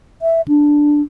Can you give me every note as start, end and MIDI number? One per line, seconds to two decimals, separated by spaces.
0.22 0.41 76
0.48 1.02 62